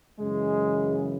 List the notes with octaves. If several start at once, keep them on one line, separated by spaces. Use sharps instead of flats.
F#2 C#3 E3 G#3